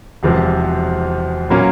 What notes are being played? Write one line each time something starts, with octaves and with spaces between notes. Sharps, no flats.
E1 E2 C3 F3
A#2 F#3 A#3 C#4